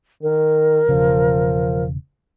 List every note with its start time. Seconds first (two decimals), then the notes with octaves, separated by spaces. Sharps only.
0.23 D#3 A#4
0.89 E1 C#3 F3